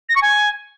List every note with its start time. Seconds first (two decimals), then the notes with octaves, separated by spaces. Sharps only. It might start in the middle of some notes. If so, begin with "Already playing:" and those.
0.09 A#6
0.15 C#6
0.22 G#5